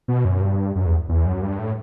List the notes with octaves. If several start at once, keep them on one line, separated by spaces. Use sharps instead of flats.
B2
F#2
G2
F#2
E2
E2
F#2
G2
A2